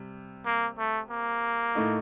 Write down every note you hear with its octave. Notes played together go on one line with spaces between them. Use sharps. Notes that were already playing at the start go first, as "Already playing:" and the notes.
Already playing: C3 G3
A#3
A3
A#3
A2 A3 D#4